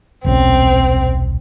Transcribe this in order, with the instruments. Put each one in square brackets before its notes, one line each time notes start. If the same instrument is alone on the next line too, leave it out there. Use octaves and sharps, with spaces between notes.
[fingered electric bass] D#1 B1 C#4 [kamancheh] C4